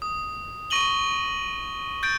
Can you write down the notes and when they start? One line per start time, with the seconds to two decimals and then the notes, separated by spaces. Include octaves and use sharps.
0.02 D#6
0.70 C#6 A#6 D#7 F#7 G7
2.03 G6 A6 D7